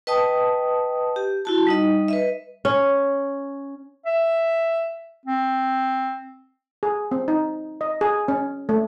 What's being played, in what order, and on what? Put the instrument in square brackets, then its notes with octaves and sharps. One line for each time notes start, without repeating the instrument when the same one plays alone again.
[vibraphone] B4 D#5 G5 A5 D#6
G4
E4 F#4 A5
G3 D#4 D#5
B4 D#5 E5
[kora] C#4
[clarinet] E5
C4
[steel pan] G#4
C4
D#4
D#5
G#4
C#4
A3